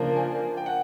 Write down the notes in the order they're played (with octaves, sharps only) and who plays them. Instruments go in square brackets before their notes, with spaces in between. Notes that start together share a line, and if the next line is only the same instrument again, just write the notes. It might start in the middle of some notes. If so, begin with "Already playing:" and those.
Already playing: [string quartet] C#3 F3 A#3 D4 [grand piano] A5
[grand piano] G#5
G5
F#5